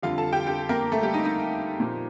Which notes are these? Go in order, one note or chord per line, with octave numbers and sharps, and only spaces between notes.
F2 D3 G3 F4 F5
A4 A5
G4 G5
G4 G5
A#3 A#4
A3 A4
G3 G4
D#4
D#4
A#2 F3